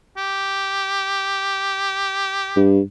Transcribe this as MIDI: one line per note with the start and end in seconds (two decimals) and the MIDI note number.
0.17 2.72 67
2.57 2.81 43